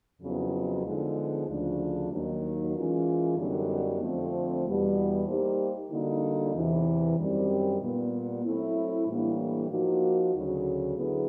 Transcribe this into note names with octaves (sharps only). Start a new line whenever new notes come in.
F2 C#3 F#3 B3 E4
D3 F3 G#3 B3 D#4
D2 C#3 F3 A3 D4
D#2 D#3 F#3 A#3 D#4
E3 G#3 C#4 F4 A#4
F#2 D3 G3 B3 D#4
F2 D3 F3 A3 C4
E2 B2 G3 B3 E4
G3 A#3 D#4 G4 C5
D3 G3 A#3 D#4 F#4
E2 C3 E3
F#2 D#3 G3 C4
A#2 G3 B3
F#3 A3 C4 E4
A2 E3 G3 A#3 D4
F3 A#3 D#4 F#4
D2 C#3 F#3
D3 F#3 B3 E4 G#4